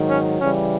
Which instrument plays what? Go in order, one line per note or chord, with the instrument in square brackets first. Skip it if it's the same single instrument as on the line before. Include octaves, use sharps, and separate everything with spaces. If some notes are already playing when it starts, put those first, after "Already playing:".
Already playing: [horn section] G#2 D#3 F#3
C#4
C#3 E3 G3 C#4